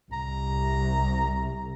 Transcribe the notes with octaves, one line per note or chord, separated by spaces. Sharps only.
C2 A#5